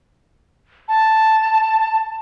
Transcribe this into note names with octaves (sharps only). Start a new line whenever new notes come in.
A5